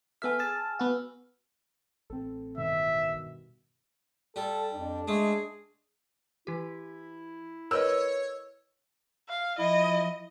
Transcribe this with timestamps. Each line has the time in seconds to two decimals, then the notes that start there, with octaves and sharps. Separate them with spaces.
0.22 B3 A4 E5 G#5 E6 F6
0.39 G#4 A5
0.79 B3 F#4
2.10 A1 C4 A4
2.57 G2 B2 D#3 E5
4.36 G3 A4
4.74 F2 D4
5.08 G#3 A3 G#4
6.47 E3 E4 G4
7.71 A#4 B4 C#5 D#5 E6
9.28 F5
9.59 F3 E4 D#5